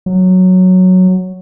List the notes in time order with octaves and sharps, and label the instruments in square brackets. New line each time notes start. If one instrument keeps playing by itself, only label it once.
[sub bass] F#3